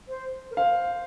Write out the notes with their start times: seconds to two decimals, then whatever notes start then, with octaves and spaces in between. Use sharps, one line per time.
0.08 C5
0.51 A#4
0.57 C5 F5